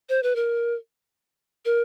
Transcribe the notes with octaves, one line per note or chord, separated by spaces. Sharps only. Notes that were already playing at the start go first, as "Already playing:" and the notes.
C5
B4
A#4
A#4